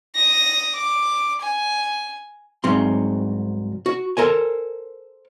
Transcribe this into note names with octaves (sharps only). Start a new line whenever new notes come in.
D#6 A#6
D6
G#5
C2 G#2 F#3 C4 C6
F#4
A4 A#4 C5 G#5